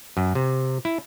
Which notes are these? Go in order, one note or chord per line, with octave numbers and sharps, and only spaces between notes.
F#2
C3
E4